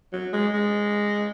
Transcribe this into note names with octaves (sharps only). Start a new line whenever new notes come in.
F#3
G#3
G#3